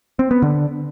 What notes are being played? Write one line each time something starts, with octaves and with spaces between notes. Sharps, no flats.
C4
B3
D3